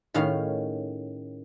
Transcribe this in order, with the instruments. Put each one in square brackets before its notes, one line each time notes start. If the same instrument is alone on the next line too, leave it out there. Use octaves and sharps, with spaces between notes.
[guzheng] A2 D#3 C#4 G#4 F5